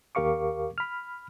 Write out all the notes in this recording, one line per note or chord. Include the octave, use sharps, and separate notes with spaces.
D#2 G4 A#4 F5 C#6 D6
B5 F6